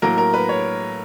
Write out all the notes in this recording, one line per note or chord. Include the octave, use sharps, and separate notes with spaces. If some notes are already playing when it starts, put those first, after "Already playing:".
A2 F#3 A#3 A#4
A#4
B4
C#5